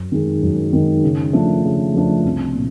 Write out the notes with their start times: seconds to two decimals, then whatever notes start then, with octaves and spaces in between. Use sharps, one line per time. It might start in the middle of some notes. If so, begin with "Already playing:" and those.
Already playing: F#2
0.12 D#3 G#3
0.42 F#2
0.73 D#3 G#3
1.03 C#3
1.33 F3 A3 D4
1.64 C#3
1.94 F3 A3 D4
2.25 C2
2.55 A#2